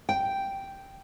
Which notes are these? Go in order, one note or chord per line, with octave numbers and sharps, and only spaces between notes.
G5